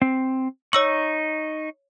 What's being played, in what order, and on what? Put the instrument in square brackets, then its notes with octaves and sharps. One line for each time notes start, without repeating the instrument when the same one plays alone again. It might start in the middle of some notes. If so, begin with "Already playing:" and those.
[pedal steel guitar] C4
[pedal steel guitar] D#4 C#6 [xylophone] C#5 E6 F#7